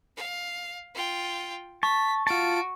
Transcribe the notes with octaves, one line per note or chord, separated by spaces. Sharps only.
F5
F4 G5
A5 C#6 B6
F4 F#4 A5 D7